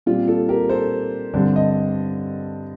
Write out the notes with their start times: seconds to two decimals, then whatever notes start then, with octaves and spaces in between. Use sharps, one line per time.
0.06 A#2 G3 C4 F4
0.28 F4 A4
0.49 G4 A#4
0.69 A4 C5
1.34 G2 D3 G3 C4
1.56 D#5